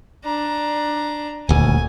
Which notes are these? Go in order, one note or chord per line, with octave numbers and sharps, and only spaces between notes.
D4 A#5
D#1 D2 G#5